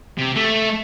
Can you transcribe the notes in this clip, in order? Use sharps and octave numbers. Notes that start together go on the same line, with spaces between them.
C3
A3